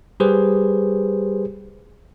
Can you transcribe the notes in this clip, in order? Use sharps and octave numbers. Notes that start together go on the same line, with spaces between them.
G3 G4 G#4 B4 C5